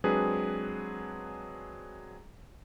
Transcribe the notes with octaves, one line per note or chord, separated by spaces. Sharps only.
F#3 G#3 C4 D4 G#4 B4